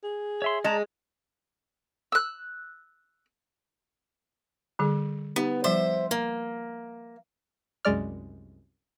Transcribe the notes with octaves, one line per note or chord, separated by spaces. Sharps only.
G#4
C#5 E5 C6
G#3 D5 A5 A#5
E6 F#6
D3 G3 G#4
B3 D#4 G4
F3 G3 C5 D5 E5
A#3
C2 F#2 G#3 D5 F6